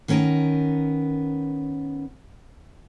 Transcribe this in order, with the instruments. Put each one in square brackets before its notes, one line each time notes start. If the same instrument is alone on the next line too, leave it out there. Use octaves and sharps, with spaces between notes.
[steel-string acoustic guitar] D#3 B3 C#4 A#4